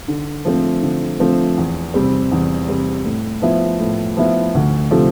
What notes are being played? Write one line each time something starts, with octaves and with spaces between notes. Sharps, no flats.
D3
F3 A3 C4
D3
F3 A3 C4
E2
C3 G3 C4
E2
C3 G3 C4
A2
F3 B3 E4
A2
F3 B3 E4
D2
C3 F3 A3 C4